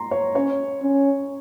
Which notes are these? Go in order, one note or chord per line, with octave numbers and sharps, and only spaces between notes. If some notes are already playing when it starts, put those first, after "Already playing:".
Already playing: A#5 C6
C#5
C#4 C#5
C#4